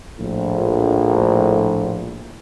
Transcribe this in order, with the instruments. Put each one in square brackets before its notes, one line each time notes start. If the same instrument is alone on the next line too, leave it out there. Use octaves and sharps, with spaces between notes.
[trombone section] A#1 A2